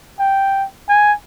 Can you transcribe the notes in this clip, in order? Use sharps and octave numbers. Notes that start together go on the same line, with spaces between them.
G5
G#5